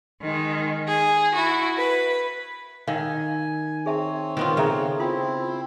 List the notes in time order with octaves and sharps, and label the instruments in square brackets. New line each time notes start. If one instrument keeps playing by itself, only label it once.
[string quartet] D#3 G#3
G#4
E4 F#4
B4
[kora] D#3 [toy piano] F5 D#6 E6 [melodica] G#5
[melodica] C4 C#5 [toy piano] G#4 E5 A5
[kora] D#3 B3 F4 [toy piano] A#4
[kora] C#3 [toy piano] A4 E5 A#5
[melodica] C4 E4 [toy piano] F4 C6 D#6